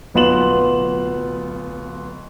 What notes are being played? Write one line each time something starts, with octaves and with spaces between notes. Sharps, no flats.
D1 B1 B3 F4 E7 F#7